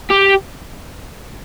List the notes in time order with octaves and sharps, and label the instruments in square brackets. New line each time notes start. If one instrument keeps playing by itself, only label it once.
[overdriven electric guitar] G4